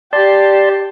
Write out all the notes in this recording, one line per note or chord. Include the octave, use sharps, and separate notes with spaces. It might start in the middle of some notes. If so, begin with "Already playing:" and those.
G4 D5 A5 C6